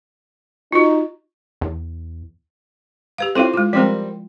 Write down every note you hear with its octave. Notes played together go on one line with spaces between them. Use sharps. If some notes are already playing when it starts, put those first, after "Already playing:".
D#4 F4 F#4
E2
G4 B4 F5
C4 E4 F4 A4 F5
G#3 F4
F3 G3 G#3 C4 A#4